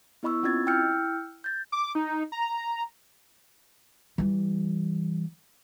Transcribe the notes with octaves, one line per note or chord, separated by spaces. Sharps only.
B3 E4 D#5 B5 C#6 E6
C4 C#4 F4 D#5 G#6 A6
E4 G5 E6 F6 G6 C#7
G6 A6
D6
D#4
A#5
E3 G3